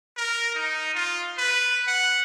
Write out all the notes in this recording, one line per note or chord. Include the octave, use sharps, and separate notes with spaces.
A#4
D#4
F4
B4
F#5